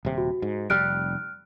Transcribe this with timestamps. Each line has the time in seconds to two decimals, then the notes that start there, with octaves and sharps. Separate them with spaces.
0.05 D#1 C3
0.18 F#4
0.42 G#2
0.70 F1 G3 F6 F#6 D7